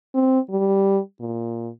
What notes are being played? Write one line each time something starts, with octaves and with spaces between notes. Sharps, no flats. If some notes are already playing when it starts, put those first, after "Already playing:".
C4
G3
A#2